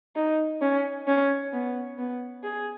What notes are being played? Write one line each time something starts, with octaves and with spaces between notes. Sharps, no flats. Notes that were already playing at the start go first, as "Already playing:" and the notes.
D#4
C#4
C#4
B3
B3
G#4